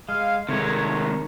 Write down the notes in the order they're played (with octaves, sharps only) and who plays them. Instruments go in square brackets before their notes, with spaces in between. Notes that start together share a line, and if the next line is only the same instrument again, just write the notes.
[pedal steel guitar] G#3 [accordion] F5
[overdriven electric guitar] C3 G#3 [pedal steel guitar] D#3 C#5 [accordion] A3